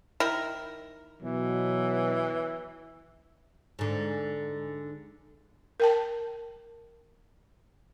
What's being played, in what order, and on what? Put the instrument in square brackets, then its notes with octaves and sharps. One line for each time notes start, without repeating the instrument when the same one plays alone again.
[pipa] D#3 E4 A#4
[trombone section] B2 F#3 [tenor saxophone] E3
[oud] G#2 D3
[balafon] A#4 G5 A5